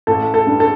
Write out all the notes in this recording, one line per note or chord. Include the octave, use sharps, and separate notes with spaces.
A1 A4
A4
G2
A4